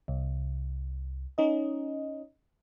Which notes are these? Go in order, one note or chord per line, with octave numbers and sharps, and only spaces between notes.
C2
C#4 D#4 D#5